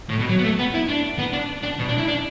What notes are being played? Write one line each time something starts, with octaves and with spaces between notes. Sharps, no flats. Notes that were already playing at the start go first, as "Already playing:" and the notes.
A2
B2
F#3
B3
A3
B3
E4
D4
B3
D4
D4
B2
D4
E4
D4